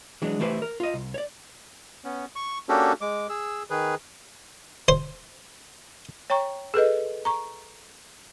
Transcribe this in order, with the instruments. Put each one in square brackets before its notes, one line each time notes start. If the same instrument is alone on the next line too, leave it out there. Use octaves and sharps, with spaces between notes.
[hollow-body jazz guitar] E3 F#3 G#3 D4
E3 A3 E4 G4 B4 C5
A#4
F4 D#5
C2
C#5 D5
[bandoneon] B3 C#4
C#6
A#3 C#4 D4 F#4 G4 A4
G#3 D6
G#4 E6
D#3 G#4 B4
[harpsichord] C5
[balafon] C#5 G5 A#5 C#6
G#4 A4 B4 D#5
A#5 C#6